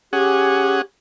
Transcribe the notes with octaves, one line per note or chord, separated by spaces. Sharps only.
C#4 G4 G#4 F#5